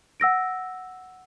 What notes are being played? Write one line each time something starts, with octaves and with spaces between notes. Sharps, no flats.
F#5 E6 A#6 D7